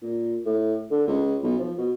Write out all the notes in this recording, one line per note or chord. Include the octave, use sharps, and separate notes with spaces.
A#2
A2
D3
C#2
B1
F3
B2